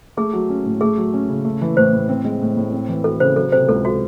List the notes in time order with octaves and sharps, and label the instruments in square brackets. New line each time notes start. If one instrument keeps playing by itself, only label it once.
[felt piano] A3 [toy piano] G#4
[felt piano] F#3
C#4
A2
[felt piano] A3 [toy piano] G#4
[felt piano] F#3
C#4
C#3
A3
E3
[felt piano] A2 [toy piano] C5
[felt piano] A2
C4
G#3
A2
A2
C4
E3
[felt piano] F#4 [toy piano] A4
[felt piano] C#3 [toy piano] C5
[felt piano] F#3 [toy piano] A4
[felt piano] C3 [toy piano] C5
[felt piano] C#2 [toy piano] A4
[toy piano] F#4